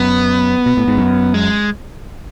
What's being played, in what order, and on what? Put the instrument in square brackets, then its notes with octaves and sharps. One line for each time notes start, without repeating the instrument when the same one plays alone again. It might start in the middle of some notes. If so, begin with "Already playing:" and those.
Already playing: [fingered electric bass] F#2 [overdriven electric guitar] B3
[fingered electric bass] B2
A2
G#2
F#2
[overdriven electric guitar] G#3